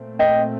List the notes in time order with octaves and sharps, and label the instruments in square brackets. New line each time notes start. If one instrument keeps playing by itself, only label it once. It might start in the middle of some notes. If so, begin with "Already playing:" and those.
Already playing: [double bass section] A#2 A3 C4
[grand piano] D#5 G5